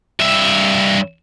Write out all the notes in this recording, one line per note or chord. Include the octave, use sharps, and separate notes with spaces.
G2 E5